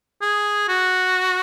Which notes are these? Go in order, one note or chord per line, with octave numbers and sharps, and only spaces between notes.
G#4
F#4